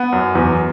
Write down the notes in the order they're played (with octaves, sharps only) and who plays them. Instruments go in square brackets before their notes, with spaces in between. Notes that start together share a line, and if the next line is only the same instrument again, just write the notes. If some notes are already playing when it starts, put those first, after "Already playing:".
Already playing: [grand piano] B3
F#2
E2